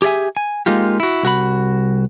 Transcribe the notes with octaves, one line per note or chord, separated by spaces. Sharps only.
G4 G#4 D5 E5 G#5
G#5
G#3 A#3 D#4 F4 G4
E4 F#4
C2 F#4 E5 B5